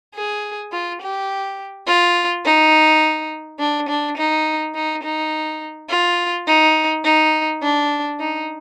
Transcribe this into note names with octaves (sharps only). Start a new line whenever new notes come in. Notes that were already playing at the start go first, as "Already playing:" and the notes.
G#4
F4
G4
F4
D#4
D4
D4
D#4
D#4
D#4
F4
D#4
D#4
D4
D#4